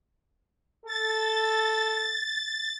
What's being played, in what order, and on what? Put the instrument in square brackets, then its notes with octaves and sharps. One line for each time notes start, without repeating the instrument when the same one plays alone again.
[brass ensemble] A4 [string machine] A6